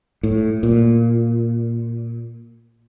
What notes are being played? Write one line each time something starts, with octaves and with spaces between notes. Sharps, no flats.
A2
A#2